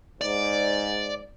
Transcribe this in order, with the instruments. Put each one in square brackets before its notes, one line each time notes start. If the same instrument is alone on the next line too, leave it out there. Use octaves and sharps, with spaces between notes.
[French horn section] G#2 [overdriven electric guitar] D5